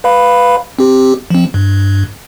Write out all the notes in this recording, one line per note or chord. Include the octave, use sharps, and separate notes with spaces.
B4 F5 B5
C4 G4
F3 C4
G2